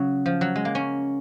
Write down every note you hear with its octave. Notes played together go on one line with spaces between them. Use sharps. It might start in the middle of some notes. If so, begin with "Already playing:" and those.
Already playing: C#3 F#3
F3
F#3
G#3
A#3
C#4